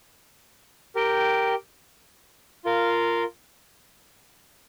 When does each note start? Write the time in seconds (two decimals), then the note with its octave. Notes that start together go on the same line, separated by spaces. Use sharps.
0.95 G4 A#4 G5
2.65 F4 A#4 F5